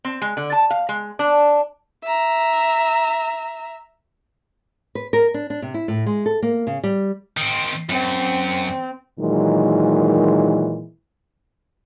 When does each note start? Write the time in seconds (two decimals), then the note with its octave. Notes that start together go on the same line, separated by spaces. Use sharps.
0.05 C4
0.22 G#3
0.37 D3
0.52 A5
0.71 F5
0.89 G#3
1.19 D4
2.04 E5 A#5
4.95 B4
5.13 A#4
5.34 D4
5.50 D4
5.62 C3
5.74 E4
5.88 A2
6.06 G#3
6.26 A4
6.42 A#3
6.67 C#3
6.84 G3
7.37 D#3 C4
7.89 F#2 C4
9.20 A#2 D#3 E3 F#3 G#3